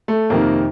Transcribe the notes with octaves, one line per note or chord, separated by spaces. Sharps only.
A3
F2 C3 D#3 A#3